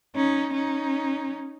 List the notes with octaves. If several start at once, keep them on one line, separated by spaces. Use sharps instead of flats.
C#4 D#4
C#4 D#4